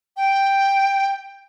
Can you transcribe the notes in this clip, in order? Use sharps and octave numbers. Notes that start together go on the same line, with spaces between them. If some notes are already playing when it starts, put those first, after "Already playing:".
G5